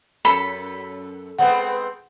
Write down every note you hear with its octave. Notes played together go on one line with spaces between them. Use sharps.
F#2 A4 B5
G#3 B3 C4 F#5